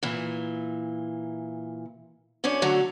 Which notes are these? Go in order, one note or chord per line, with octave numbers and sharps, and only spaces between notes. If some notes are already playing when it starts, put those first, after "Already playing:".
A#2 E3
F#2 C#4 D4 C#5
D3 F#3 A3